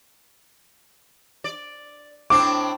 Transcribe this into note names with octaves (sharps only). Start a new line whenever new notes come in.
D5
A2 C4 D4 D6